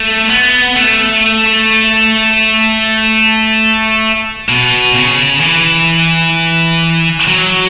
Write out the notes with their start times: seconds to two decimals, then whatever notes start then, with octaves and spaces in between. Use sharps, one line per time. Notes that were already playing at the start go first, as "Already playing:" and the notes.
Already playing: A3
0.30 B3
0.76 A3
4.49 B2
4.95 C#3
5.41 E3
7.27 F#3